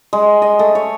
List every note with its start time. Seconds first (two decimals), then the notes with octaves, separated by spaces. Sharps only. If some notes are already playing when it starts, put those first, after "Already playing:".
0.13 G#3
0.42 D#5
0.59 A3
0.75 C#5